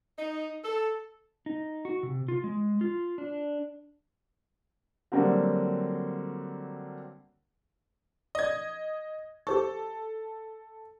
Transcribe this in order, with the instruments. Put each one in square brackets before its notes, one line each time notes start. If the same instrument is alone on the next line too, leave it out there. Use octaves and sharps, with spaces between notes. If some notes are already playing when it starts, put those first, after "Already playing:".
[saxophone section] D#4
A4
[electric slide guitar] D#4
F#4
C3
F4
G#3
F4
D4
[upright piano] D3 F#3 G3 A#3 C4 F#4
[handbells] D5 [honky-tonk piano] D#5 G#6
[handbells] G4 C5 C#6 [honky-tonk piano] A4